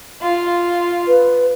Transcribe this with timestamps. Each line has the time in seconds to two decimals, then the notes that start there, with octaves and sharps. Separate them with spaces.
0.22 F4
1.08 B4